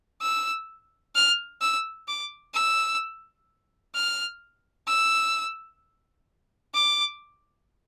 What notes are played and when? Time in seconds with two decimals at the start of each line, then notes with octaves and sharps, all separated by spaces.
0.22 E6
1.16 F6
1.62 E6
2.08 D6
2.54 E6
3.95 F6
4.88 E6
6.74 D6